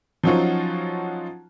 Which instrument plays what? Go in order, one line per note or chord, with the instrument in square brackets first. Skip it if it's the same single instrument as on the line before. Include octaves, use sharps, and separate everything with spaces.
[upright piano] F3 F#3 C#4 D#4 F4 F#4